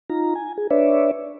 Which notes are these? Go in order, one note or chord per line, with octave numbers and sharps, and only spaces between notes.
D#4 F4 A#5
G#5
G#4
D4 B4 C#5 D5 E5